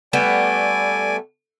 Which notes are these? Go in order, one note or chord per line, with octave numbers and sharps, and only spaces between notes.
G3 A3 B3 D5 G#5